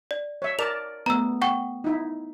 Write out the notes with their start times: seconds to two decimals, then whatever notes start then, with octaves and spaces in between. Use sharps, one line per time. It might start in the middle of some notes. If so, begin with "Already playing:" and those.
0.11 D5
0.42 C#5 E5
0.59 A#4 D5 A5 F7
1.06 A3 B3 A#5 E6
1.42 F#5 G5 C#6
1.84 D#4 E4